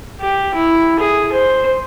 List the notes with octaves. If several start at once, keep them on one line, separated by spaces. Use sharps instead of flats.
G4
E4
G#4
C5